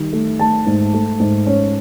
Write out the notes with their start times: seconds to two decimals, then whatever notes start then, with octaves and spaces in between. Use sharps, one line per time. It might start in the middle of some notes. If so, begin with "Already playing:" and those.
Already playing: D#3 G3
0.12 A3
0.39 A3 A5
0.66 G#2
0.93 A3
1.20 G#2
1.47 C#4